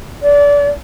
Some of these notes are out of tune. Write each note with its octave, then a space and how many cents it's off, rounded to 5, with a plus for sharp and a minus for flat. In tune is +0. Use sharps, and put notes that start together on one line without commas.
D5 -30